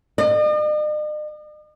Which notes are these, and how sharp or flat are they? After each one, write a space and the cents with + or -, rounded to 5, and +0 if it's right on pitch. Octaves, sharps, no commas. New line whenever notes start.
D#5 -45